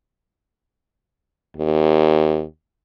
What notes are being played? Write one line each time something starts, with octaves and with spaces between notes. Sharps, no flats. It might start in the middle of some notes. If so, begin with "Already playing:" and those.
D#2